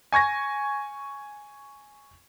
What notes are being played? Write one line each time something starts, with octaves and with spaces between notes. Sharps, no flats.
G#5 C#6 G#6 A#6